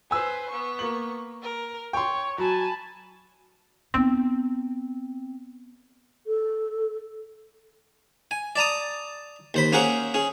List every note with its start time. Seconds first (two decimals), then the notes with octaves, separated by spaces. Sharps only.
0.11 B4 C5 G#5 E6
0.49 B3 C#6
0.79 A#3 F#7
1.40 A#4
1.93 C#5 G5 C6
2.38 F#3 G#5 A5 B5
3.94 B3 C4 D#4
6.27 A4
8.31 G#5
8.56 D5 A5 A#5 D#6
9.54 D#2 C5 B5
9.72 A#3 C#4 G#4 C5 F#5 A#5
10.14 C#4 G#4